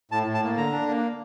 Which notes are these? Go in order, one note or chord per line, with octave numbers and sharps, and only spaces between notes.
A2 A5
A2
A5
A#3
D3 A#5
D4
A#3